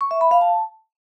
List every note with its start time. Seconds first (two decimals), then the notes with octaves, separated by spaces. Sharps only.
0.01 C#6
0.11 E5
0.21 B5
0.31 F5
0.41 A5